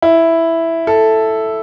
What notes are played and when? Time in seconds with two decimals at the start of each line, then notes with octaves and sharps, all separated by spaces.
0.02 E4
0.87 A4